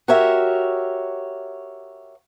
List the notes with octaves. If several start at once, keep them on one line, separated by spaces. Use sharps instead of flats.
F#4 G4 A#4 C#5 E5